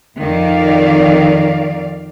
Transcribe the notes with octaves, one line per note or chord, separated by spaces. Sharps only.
F2 D#3 D5 F5